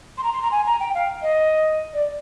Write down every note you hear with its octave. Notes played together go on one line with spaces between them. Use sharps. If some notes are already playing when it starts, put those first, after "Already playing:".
C6
A#5
C6
A#5
G#5
A#5
G5
F5
D#5
D5